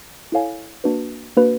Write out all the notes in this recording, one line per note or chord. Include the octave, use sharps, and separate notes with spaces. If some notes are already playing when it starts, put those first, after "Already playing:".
E4 A4 C#5 F5 G#5
A#3 D4 F#4 B4
A#3 D4 F#4 B4